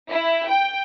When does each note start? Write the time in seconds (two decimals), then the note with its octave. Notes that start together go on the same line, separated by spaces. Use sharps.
0.11 E4
0.49 G5